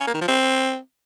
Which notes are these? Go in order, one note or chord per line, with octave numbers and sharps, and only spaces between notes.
C#4
A#3
D#3
F3
C4